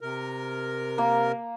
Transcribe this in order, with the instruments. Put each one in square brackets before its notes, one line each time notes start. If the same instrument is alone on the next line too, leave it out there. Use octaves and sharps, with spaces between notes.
[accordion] C3 A#4
[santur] A#3